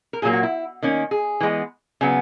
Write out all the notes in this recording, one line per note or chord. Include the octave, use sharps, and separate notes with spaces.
A#4
A#2 F#3 A#3 G#4
F#4
E4
D#3 A#3 C#4
G#4
E3 G#3 B3
C#3 F#3 B3